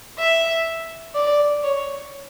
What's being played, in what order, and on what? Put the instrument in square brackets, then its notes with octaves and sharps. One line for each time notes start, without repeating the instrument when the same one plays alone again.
[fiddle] E5
D5
C#5